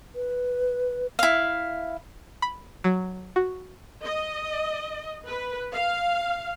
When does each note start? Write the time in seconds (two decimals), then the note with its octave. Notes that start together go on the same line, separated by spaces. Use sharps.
0.15 B4
1.19 E4 F5
2.42 B5
2.84 F#3
3.36 F#4
4.04 D#5
5.26 B4
5.74 F5